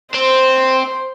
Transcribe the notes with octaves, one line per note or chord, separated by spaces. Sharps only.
C4 C5